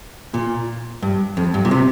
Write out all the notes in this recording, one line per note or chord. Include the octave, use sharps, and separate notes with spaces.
A#2
G2
F2
G2
A#2
C3